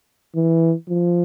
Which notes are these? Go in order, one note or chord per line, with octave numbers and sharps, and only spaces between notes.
E3
F3